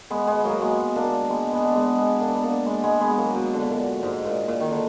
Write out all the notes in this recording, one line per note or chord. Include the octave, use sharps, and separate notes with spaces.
G#3 B3
G#3 B3
F#3 A#3
G#3 B3
A#3 D4
G#3 B3
G#3 B3
D4
G#3 B3
G#3 B3
A#3 D4
B3
A#3 D4
G#3 B3
G#3 B3
G#3 B3
G#3
F#3 A#3
B2
D3
B2
A#2
G#2
A#2
A#2
D#3
D3